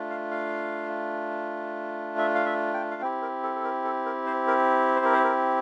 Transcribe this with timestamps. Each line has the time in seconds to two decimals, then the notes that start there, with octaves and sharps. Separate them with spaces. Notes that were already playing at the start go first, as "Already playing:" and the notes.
Already playing: A3 D4 F4
0.10 F5
0.31 F5
2.18 E5
2.35 F5
2.46 E5
2.74 G5
2.91 F5
3.02 C4 E4 G4 G5
3.22 A#4
3.43 A4
3.56 A4
3.64 A#4
3.84 A4
4.06 A#4
4.26 C5
4.47 A#4
4.96 C5
5.05 A#4
5.14 C5
5.24 A#4